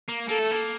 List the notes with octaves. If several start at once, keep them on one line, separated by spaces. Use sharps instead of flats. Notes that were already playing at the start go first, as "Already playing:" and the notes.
A#3
A#3 A4
A3
A#3